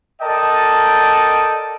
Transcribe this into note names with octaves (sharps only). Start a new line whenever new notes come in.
A4 A#4 D5 D#5 G5 A5